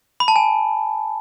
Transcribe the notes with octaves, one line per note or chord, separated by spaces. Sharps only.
B5
A5
G#5